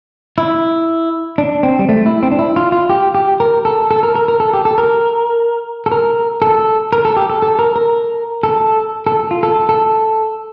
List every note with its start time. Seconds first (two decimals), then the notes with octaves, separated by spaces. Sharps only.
0.38 E4
1.38 D4
1.63 C4
1.79 G3
1.89 A3
2.06 E4
2.23 C4
2.31 D4
2.39 E4
2.56 F4
2.72 F4
2.90 G4
3.15 G4
3.40 A#4
3.65 A4
3.91 A4
4.03 A#4
4.15 A#4
4.28 A#4
4.40 A4
4.54 G4
4.65 A4
4.78 A#4
5.86 A4
5.92 A#4
6.42 A4
6.93 A#4
7.05 A4
7.17 G4
7.30 A4
7.42 A4
7.59 A#4
7.76 A#4
8.43 A4
9.07 A4
9.31 F4
9.43 A4
9.69 A4